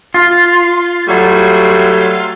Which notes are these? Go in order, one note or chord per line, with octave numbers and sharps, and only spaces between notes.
F4
F#3 G3 A3